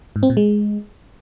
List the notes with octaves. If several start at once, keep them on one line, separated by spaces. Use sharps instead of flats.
G#2
C4
A#2
G#3